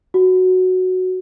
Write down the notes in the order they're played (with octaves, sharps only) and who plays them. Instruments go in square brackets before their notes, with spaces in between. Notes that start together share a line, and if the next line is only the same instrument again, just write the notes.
[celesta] F#4